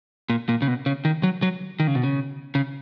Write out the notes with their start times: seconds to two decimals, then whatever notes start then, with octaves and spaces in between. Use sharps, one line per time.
0.30 A#2
0.49 A#2
0.62 C#3
0.68 B2
0.86 C#3
1.05 D#3
1.23 F#3
1.42 F#3
1.80 D#3
1.87 C#3
1.95 B2
2.03 C#3
2.55 C#3